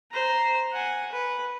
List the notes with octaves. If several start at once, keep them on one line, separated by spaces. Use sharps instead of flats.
C5 A#5
F#5 G#5
B4